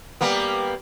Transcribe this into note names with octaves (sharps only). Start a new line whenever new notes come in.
G3 A#3 B3